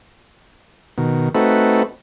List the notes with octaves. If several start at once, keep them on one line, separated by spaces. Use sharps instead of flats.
B2 D#3
A3 C4 D#4 F#4 A4 B4